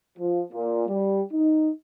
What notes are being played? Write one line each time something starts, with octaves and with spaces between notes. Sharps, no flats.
F3
A#2
G3
D#4